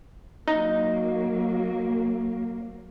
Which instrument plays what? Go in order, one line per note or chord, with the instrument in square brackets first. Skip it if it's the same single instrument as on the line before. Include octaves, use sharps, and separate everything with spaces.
[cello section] F#3 A#3 [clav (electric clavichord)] D#4